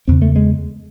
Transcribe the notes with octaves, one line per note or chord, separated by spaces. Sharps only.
E2 C#3 C4
A3
G#3